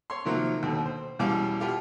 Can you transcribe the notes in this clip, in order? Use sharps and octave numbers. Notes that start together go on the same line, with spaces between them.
C#5 C6
C3 D#3 F3 F#3 A#3
D#2 B2 D3
C5
E2 B2 G3 C#4 F5 D6
B2 F4 G4 F5